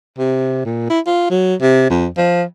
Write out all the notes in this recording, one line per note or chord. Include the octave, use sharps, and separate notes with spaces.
C3
A#2
E4
F4
F#3
C3
F2
F3